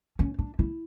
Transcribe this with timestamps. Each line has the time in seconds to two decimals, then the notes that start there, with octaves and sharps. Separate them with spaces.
0.19 C#4
0.39 D4
0.59 E4